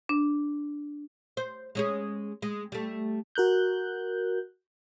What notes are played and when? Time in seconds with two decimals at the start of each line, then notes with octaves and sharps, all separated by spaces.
0.09 D4
1.37 C5
1.75 G#3 C#4 G#4
2.42 G#3
2.72 G3 A3
3.35 F#4 A#4 F#6 G6